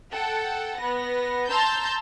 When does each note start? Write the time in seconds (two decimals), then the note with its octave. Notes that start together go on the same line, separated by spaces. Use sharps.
0.12 A4 F#5 G5
0.78 B3 A#6
1.49 A5 A#5 C6 E6 G6